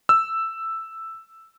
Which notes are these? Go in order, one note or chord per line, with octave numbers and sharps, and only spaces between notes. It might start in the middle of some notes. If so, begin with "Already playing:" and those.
E6